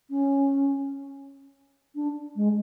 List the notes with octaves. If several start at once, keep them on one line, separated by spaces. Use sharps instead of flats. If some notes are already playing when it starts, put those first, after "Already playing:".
C#4
D4
G#3